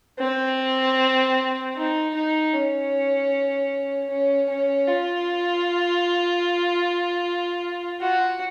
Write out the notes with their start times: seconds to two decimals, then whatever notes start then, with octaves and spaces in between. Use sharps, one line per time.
0.19 C4
1.75 D#4
2.15 D#4
2.53 C#4
4.10 C#4
4.49 C#4
4.88 F4
8.01 F#4